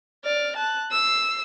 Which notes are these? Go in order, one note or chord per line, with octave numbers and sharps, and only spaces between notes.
D5 F6
A5 F#6
E6 C7